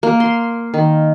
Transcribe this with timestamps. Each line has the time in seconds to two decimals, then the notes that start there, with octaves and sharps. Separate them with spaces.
0.03 A#3
0.20 C6
0.74 D#3